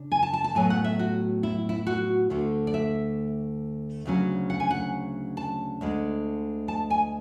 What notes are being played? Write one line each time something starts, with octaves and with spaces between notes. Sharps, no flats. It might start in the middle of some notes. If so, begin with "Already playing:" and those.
Already playing: C#3 D4
G#5
A5
A5
A5
A2 F#3 B3 G#5
F#5
E5
F#4
E4
E4
F#4
D2 D3 A3
D5
E5
D2 C#3 F#3 C#4
F#5
G#5
F#5
A5
D2 D3 G#3
A5
G#5